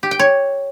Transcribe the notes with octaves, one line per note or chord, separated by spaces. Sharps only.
G4
G5
C#5